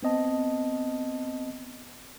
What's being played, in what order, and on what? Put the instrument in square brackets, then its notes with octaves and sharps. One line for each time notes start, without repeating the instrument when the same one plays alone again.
[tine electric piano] B3 C4 D#5 A5